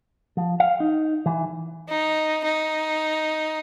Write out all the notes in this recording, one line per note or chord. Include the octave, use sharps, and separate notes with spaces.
F3
F5
D#4
E3
D#4
D#4